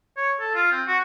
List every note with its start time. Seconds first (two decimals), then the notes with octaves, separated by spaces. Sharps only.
0.17 C#5
0.40 A4
0.55 F4
0.72 C4
0.87 F#4